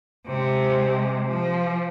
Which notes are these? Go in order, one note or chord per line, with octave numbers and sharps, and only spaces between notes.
C3 G#3
F3